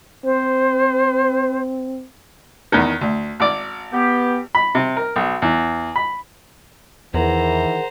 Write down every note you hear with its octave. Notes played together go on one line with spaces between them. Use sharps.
C4 C5
E2 D#3
D2
G#1 D5
B3 G4
B5
C3
A#4
B1
E2
B5
E2 D#3 E3 G#4 A#4 C5 F#5 A#5